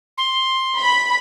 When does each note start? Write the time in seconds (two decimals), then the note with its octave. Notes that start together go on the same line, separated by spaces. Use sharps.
0.18 C6
0.77 B5